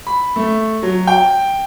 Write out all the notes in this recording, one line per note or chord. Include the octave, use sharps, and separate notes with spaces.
B5
A3
F#3
G5